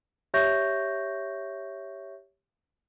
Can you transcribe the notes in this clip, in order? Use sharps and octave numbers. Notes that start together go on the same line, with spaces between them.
G4 C#5 E5 C#6 G6 A#6